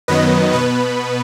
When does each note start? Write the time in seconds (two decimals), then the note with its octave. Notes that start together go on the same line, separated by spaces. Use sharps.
0.08 F#2 D#3 F#3 B3 B4 D#5
0.53 B2 B3 B4